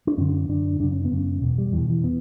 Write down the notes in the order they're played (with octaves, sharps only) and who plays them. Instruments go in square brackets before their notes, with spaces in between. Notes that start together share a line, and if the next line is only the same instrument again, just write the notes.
[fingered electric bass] D4
F#2 D3 C#4
F#2 D3 D4
F#2 C#3 D4
C#4
B3
F#2 C#3
C#4
E2 B2
G3
E2 B2 E3
E3
B3